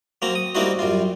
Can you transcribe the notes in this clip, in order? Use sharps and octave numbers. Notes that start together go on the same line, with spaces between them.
F#3 A#3 C4 A#5
D#6
G3 A#3 C4 D#4 E4 F#4
F#2 G3 F4